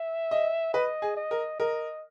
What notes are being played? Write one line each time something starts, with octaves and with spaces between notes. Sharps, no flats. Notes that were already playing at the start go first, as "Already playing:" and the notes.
Already playing: E5
D#5
B4 D#5
G#4
D#5
A#4
A#4 D#5